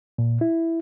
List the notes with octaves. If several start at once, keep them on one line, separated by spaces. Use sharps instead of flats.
A#2
E4